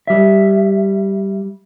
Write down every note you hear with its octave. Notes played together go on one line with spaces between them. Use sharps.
G3 E5